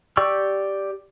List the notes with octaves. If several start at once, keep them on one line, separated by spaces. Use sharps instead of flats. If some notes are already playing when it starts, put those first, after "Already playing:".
G4 D5 G5 C#6 E6